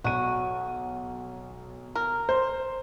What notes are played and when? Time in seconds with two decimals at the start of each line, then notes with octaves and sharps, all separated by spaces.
0.04 B1 F#4 D#7
1.95 A#4
2.29 C5